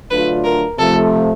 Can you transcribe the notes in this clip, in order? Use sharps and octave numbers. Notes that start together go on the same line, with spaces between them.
D3 F#3 A3 D4 F4 B4
A#4
C3 F3 A3 A4